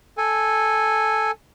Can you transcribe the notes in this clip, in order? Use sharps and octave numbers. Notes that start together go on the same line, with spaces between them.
A4 G#5